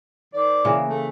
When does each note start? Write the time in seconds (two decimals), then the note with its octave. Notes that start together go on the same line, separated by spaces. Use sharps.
0.34 D#3 C5 D5
0.65 C#3 E3 A#3
0.89 A3